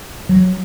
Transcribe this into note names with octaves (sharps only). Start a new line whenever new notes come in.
F#3